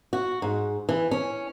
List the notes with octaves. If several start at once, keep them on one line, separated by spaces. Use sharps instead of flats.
F#4
G#2
E3
C#4